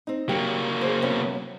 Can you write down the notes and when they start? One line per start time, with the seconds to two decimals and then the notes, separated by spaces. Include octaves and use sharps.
0.07 C4 D#4
0.29 F#3 A#3 G4
0.81 G#4 C5
1.02 C3 B3 C#4